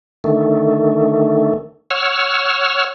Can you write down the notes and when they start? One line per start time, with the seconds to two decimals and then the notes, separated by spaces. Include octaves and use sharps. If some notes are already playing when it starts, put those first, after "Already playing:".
0.24 D3 D#3 A3
1.91 C#5 F#5 E6 F6